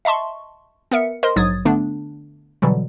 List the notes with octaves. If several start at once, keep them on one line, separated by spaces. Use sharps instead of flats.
D#5 E5 A5 C6 C#6
B3 A#4 E5 C#7
A#4 C5 D#5 C6
A#1 G#2 F#3 D#6 G#6 A6
D3 A3 B3 D4
B2 D3 E3 F#3 G3